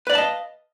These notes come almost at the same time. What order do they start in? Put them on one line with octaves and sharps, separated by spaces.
B4 D5 F5 A5 D#5